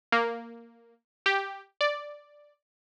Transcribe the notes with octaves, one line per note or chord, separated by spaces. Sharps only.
A#3
G4
D5